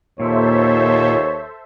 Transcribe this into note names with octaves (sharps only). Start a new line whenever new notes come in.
D#2 A#2 A4 C5 C#5 E5